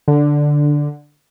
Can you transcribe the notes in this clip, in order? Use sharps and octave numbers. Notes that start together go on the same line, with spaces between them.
D3